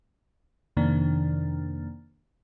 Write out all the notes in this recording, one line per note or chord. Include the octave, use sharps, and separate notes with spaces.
F2 C3 D#3 A#3 D4